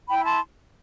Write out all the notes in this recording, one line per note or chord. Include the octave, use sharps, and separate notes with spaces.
E4 G5 B5
B5
A5 C6